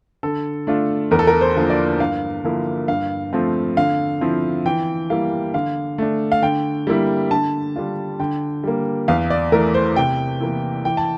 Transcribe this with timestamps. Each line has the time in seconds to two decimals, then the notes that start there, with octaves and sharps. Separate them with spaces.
0.23 D3 A4
0.67 A3 D4 F4
1.11 E2 A#4
1.19 A4
1.27 A#4
1.41 C5
1.56 D3 F3 A#3
1.70 D5
2.00 G2 F5
2.44 D3 F3 A#3 E4
2.88 G2 F5
3.33 F3 A3 C4
3.77 D3 F5
4.21 F3 C4 E4
4.66 E3 G5
5.10 G3 A#3 E4 F5
5.54 D3 F5
5.98 A3 D4
6.32 F5
6.42 D3 G5
6.87 G3 A#3 E4
7.31 D3 A5
7.76 G3 D4 F4
8.20 D3 G5
8.64 G3 A#3
9.08 E2 F5
9.30 D5
9.52 E3 A3 E4 A#4
9.74 C5
9.96 C3 G5
10.40 E3 A#3 E4
10.85 E3 G5
10.97 A5